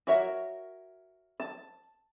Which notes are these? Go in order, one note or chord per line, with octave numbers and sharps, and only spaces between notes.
F#4 A#4 C#5 E5
A5